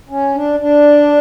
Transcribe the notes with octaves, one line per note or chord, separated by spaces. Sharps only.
C#4
D4
D4